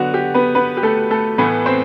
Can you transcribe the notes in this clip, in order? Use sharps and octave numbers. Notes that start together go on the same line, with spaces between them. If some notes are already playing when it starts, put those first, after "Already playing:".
Already playing: D3 F#3 B3 F#4
G4
B3 B4
B3 B4
G4
A3 A4
A3 A4
A2 E3 A3 B3 B4
C4 C5